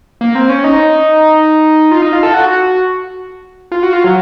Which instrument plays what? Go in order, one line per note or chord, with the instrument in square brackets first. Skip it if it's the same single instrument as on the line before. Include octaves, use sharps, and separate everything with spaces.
[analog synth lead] A#3
C4
C#4
D#4
F4
D#4
F4
A4
F#4
F4
F#4
F4
F#3